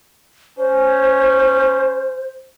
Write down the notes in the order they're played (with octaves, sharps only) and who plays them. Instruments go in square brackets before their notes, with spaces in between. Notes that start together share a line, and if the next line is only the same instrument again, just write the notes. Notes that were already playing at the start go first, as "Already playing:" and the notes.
[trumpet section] C#4 [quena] C5